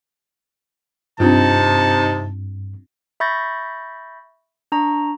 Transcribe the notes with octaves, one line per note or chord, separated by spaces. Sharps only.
G2 C3 C4 D4 D#4 F4 A5
E5 B5 C#6 G6 A6 A#6
D4 A#5 C#6